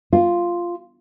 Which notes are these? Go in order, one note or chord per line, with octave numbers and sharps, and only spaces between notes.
F4